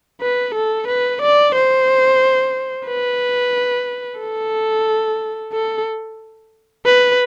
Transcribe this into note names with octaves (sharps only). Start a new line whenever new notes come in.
B4
A4
B4
D5
C5
B4
A4
A4
B4